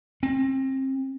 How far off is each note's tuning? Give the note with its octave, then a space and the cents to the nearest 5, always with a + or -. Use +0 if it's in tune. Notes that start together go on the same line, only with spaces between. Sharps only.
C4 +30